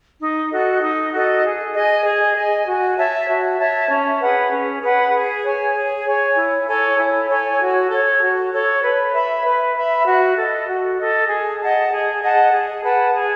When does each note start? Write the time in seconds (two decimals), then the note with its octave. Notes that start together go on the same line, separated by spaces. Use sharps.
0.20 D#4
0.51 F#4 A4 D#5
0.82 D#4
1.12 F#4 A4 D#5
1.43 G#4
1.74 D#5 G#5
2.05 G#4
2.35 D#5 G#5
2.66 F#4
2.97 C#5 E5 A5
3.28 F#4
3.58 C#5 E5 A5
3.89 C#4
4.20 G#4 B4 F#5
4.51 C#4
4.82 G#4 B4 F#5
5.13 G#4
5.44 C#5 G#5
5.74 G#4
6.06 C#5 G#5
6.37 E4
6.67 A4 C#5 G#5
6.98 E4
7.29 A4 C#5 G#5
7.60 F#4
7.90 A4 C#5
8.21 F#4
8.52 A4 C#5
8.83 B4
9.14 E5 B5
9.45 B4
9.76 E5 B5
10.06 F#4
10.37 A4 D#5
10.68 F#4
10.99 A4 D#5
11.29 G#4
11.60 D#5 F#5 A5
11.91 G#4
12.22 D#5 F#5 A5
12.52 G#4
12.84 B4 F#5 A5
13.14 G#4